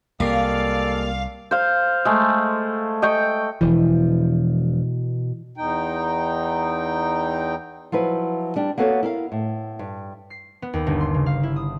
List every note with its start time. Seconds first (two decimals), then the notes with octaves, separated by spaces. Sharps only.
0.20 C2 G#3 A#3 G4 A4 D5 F5
1.51 C5 F5
2.05 G#3 A3
3.02 D#5 G5 C#6
3.61 E1 B2 E3 F3
5.57 E2 D#4 G5
7.92 F3 F#3 E4 B4
8.56 G3 D4 G5
8.78 A#3 B3 F#4 A4 C#5
9.03 E4 A#4 F5
9.32 A2
9.79 G2
10.30 C7
10.62 B3
10.73 D#2
10.87 G1
11.00 C6
11.14 C#3
11.26 F5
11.43 E4
11.56 D#6